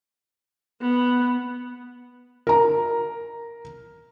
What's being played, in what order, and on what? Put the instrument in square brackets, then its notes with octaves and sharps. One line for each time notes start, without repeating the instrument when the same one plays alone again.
[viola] B3
[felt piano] A#4 A#5